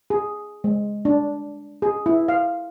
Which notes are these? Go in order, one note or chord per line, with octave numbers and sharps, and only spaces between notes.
G#4
G#3
D4
G#4
E4
F5